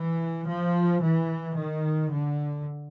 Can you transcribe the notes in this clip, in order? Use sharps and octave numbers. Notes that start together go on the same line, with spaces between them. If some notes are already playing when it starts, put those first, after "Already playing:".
Already playing: E3
F3
E3
D#3
D3